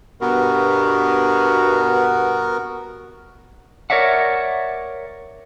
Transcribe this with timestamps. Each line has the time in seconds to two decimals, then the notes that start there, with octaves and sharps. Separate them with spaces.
0.21 G2 B2 B3 F#4 A#4
3.90 A#4 C#5 D5 E5 F#5